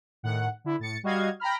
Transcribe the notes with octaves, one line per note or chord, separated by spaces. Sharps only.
A2 D#3 F#5
D3 E4
A2 A6 C#7
G3 F#4 D#5 F5 G#6
G5 A#5 B5 F6